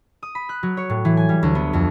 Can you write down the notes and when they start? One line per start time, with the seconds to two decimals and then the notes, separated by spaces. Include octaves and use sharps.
0.23 D#6
0.35 B5
0.49 F#6
0.63 F#3
0.77 C#5
0.90 A2
1.05 E3
1.17 G#5
1.29 G3
1.43 D2
1.55 B3
1.73 F2